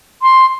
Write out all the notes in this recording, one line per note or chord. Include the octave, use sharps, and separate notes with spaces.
C6